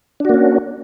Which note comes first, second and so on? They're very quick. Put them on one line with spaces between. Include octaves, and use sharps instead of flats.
D4 F#4 A#3 C#4